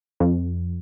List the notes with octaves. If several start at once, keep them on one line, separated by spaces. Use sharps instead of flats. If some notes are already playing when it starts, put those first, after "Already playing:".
F2